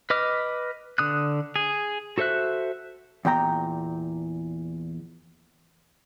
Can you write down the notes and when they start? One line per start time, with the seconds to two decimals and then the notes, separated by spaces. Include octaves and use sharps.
0.10 B4 D#5 D6 F6
0.98 D3 D#6 F#6
1.56 G#4
2.18 F#4 A4 C5 E5 F#6
3.25 E2 A#2 G5 A#5